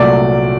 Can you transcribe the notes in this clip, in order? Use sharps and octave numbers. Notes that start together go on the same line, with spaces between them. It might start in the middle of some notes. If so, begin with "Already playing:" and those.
Already playing: C2 A#2 F#3 A3 D5